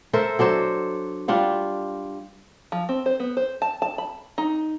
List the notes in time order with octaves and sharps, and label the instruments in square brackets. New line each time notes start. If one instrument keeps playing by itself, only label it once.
[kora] A4 A#4 C5 E5
F#3 D4 A4 C5
G3 D4 F4 F#5
[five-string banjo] F3
C4
C5
B3
C5
A5
A5
B5
D#4